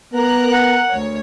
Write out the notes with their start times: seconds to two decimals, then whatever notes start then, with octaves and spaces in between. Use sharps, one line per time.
0.13 B3 A#4 A#5 F#6
0.52 F#5
0.90 D2 C#5